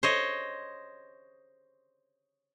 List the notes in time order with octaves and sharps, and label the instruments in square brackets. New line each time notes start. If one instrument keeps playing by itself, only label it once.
[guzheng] C5 C#5 D#5